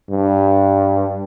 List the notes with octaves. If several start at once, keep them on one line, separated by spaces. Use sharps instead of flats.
G2